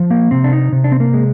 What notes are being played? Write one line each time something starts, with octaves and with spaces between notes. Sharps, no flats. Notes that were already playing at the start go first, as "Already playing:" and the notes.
Already playing: F3
A#3
C3 C4
D4
D#4
C3
D4
C4
A#3
G#3